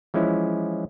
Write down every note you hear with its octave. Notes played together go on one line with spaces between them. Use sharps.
E3 F3 G#3 C#4 E4